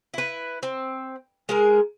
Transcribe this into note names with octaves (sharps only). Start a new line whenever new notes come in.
E4 B4
C4
G#3 G#4 A#4